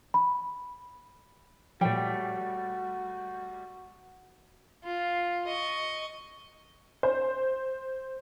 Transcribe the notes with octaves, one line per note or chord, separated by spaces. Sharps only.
B5
A#2 F3 G3 A3 F#4 C5 C#5 G5
F4
D#5 C#6
C5